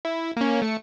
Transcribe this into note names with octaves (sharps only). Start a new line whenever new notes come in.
E4
A#3 C#4
A3 C#7